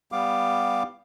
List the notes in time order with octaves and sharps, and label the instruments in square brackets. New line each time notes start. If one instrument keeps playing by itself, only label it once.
[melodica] G3 B3 F5 D6